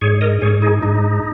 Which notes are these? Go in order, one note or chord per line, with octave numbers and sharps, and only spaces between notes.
G#2 G#4 C#5
A#4 D#5
G#2 G#4 C#5
D#4 G#4
G#2 D#4